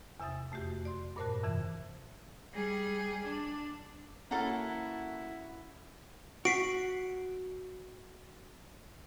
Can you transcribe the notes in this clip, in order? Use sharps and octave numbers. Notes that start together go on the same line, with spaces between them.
E2 C3 E5 D#6 A6
F2 A3 F#4 G4
D5 C6
G2 A#2 A#4 C5 A5 F#6
F2 C3 E3 E5
G3 G#4
D4
A#3 C#4 E4 F#4 A4
F#4 B6 C7 D7